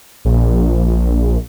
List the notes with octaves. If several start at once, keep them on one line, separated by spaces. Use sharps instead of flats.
A#1